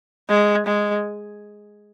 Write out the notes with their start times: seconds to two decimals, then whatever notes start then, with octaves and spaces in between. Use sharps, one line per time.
0.29 G#3
0.67 G#3